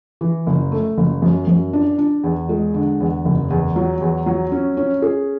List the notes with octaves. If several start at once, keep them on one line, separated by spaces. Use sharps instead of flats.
E3
F#1
A3
F#1
F#2
F#2
D4
D4
E2
G#3
D3
E2
F#1
E2
F#3
E2
F#3
C#4
C#4
G#4